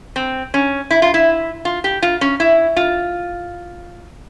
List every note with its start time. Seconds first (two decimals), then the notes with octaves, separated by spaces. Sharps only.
0.16 C4
0.54 C#4
0.91 E4
1.02 F4
1.14 E4
1.65 F4
1.84 G4
2.02 F4
2.21 C#4
2.40 E4
2.76 F4